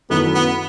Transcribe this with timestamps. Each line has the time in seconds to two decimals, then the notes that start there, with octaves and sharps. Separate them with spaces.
0.10 F#2 D#3 A3 B3 E4
0.35 B3